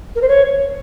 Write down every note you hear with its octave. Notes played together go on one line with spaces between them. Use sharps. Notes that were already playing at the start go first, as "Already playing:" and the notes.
A#4
C5
C#5